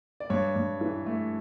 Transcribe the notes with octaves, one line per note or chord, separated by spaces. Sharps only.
D5
G2 C#5
G2
E3
A3